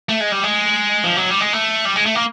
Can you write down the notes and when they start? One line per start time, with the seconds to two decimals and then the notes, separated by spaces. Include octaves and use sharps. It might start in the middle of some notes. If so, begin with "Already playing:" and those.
0.09 A3
0.20 G#3
0.32 G3
0.43 G#3
1.04 F3
1.17 F#3
1.29 G3
1.40 G#3
1.53 A3
1.85 G3
1.96 G#3
2.06 A3
2.15 A#3